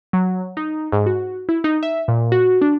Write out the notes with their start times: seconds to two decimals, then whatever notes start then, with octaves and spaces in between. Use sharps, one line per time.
0.13 F#3
0.57 D#4
0.92 G#2
1.06 F#4
1.49 E4
1.64 D#4
1.83 E5
2.08 A#2
2.32 F#4
2.62 D4